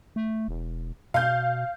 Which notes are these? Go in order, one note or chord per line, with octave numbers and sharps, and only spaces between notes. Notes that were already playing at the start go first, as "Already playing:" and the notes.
A3
E1
B2 F5 G6